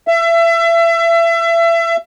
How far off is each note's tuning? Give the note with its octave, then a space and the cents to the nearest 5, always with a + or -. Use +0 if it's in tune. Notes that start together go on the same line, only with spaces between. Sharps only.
E5 +30